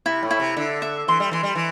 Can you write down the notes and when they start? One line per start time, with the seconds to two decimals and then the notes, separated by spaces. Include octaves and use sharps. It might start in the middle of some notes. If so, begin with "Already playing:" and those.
0.06 C3 E4
0.23 A2
0.31 E4
0.40 C3
0.56 D3 E5
0.82 E5
1.08 E3 C6
1.20 G3
1.31 E3 C6
1.43 G3
1.55 E3